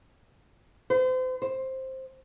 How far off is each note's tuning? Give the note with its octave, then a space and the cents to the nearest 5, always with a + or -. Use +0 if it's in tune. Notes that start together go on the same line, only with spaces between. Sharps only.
C5 -35
C5 +10